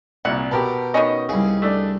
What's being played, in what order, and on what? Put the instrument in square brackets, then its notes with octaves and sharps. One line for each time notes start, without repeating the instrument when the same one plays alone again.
[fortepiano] C2 A#2 [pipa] F#5
[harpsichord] B2 [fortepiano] G4 A#4 A5
[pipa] D#3 B3 C#4 [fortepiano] D#5
[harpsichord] C2 G#4 [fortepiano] C#3
[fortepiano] A3 D4